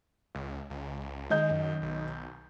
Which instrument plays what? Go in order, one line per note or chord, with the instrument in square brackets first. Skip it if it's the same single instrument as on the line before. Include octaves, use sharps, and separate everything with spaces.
[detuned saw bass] C#2
C#2
[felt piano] D#3 D#5 G6 [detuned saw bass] G#3
[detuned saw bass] F#2
B1